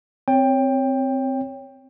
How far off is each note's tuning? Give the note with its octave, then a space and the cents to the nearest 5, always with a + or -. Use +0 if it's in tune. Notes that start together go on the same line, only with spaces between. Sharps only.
C4 -5 C#5 +0 G5 +15